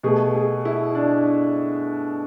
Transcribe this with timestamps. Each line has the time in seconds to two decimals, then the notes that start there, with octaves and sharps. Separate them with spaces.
0.03 B2 A3 G#4
0.35 G#4
0.65 E4
0.95 D4